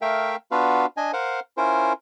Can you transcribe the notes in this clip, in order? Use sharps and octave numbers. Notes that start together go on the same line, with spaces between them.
A3 A#4 E5 F5 G5
B3 D4 F4 F#4 B4 F5
D4 D#5 G#5
A#4 C5 F5 F#5
C#4 E4 F4 A#4 C5